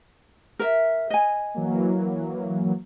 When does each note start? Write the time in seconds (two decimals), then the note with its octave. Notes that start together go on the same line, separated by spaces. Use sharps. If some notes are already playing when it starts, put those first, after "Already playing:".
0.59 A#4 E5
1.10 D#5 G#5
1.55 E3 F#3 A#3